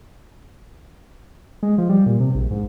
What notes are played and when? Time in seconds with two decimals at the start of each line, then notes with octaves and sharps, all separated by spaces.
1.63 G#3
1.78 F3
1.89 G3
2.06 A#2
2.20 C3
2.35 A#1
2.51 G#2